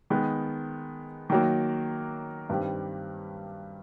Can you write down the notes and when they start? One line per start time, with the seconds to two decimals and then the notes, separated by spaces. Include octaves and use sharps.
0.10 D#3 G#3 B3
1.30 D#3 F#3 A#3
2.49 G2 D#3 G3 C4